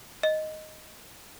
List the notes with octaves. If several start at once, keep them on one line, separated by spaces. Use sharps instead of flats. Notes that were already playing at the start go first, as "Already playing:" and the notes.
D#5